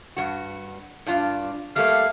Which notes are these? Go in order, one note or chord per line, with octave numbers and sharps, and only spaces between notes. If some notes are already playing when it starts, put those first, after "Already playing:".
G2 F#4
G2 D4 F4
G3 A3 A#3 F5